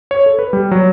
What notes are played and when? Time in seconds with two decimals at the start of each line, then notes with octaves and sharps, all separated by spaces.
0.11 C#5
0.26 A4
0.39 B4
0.53 G3
0.71 F#3